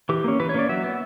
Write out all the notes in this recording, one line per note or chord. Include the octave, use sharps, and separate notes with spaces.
E3 G4
A#3 C#4
E3 B4
C#5
A#3 C#4 D5
F#3 E5
B3